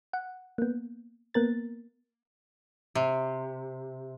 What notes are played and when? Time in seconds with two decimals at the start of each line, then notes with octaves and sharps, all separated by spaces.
0.13 F#5
0.58 A#3 B3
1.34 A#3 B3 A#4 A6
2.95 C3